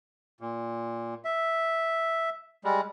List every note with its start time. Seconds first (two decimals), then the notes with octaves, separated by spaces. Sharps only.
0.41 A#2
1.25 E5
2.64 G3 G#3